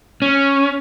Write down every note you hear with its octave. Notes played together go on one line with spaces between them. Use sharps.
C#4